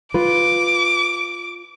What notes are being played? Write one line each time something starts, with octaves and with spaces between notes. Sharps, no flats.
F4 B4 D6